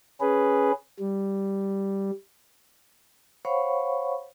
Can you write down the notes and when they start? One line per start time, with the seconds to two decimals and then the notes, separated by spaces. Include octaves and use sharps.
0.21 C#4 G#4 B4
1.00 G3
3.45 C5 C#5 F5 F#5 B5 C#6